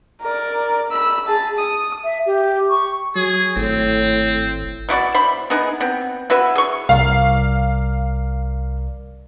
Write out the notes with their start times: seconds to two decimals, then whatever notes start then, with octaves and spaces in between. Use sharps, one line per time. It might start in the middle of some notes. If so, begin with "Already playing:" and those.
0.22 A#4 D5
0.92 B5 E6
1.27 G#4 A5
1.58 D#6
2.04 E5
2.26 G4
2.70 C#6
3.15 F#3 G#4
3.56 G#1 A2 C4
4.89 B2 E4 F#4 D5
5.14 C5 E5 B5
5.50 B3 D#4 E4 G#4
5.80 B3 C4
6.30 E4 F#4 B4 E5
6.55 G#4 C#6
6.89 C2 A#4 D5 F5